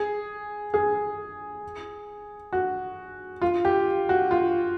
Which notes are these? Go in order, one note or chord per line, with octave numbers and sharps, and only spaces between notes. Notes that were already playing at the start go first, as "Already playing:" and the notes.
Already playing: G#4
G#4
F#4
F4
G4
F#4
F4